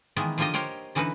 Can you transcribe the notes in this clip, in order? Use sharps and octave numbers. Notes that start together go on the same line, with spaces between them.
D#3 E3 G#3 A#3 B3
D3 F3 A#3 F4 G4 D#5
G4 A#4 C5 C#5 F#5 G5
D3 E3 C#4 D#4 F#4 B4